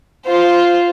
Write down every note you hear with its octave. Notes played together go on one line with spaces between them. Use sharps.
F4 C5